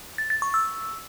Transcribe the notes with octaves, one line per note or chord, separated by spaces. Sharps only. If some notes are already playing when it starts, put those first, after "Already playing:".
A6
A6
C#6
E6